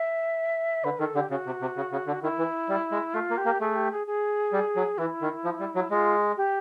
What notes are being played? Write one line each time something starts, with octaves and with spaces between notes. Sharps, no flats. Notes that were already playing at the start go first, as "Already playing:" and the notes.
Already playing: E5
D3 B4
D#3 A4
D3 G4
C#3 F#4
C3
C3
C#3
C#3
D3
D#3 E4
E3
G3
G#3
A3 F4
A#3
G4
A#3
A3 G#4
G4
G#4
G#4
G3
F#3
E3 E4
D#3
F3
G3
F#3
G#3 F4
G4